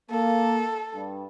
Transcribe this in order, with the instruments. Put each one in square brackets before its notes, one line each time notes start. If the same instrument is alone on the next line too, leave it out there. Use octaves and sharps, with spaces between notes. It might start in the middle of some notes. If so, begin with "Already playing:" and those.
[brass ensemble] A#3 [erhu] A4
[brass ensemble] G2